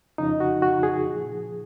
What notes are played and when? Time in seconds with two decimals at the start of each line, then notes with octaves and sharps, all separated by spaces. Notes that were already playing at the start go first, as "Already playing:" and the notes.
0.18 F2 C#3 F3 D#4
0.40 F#4
0.62 F#4
0.83 G#4
1.05 A#2 F3